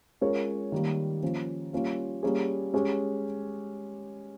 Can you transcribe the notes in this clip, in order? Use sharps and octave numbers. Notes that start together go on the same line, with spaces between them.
G#3 C#4 F4 A#4 C#5
D#3 G3 A#3
F3 A#3 C#4
G3 A#3 C#4 F4
G3 A#3 C#4 G#4
G#3 C#4 G4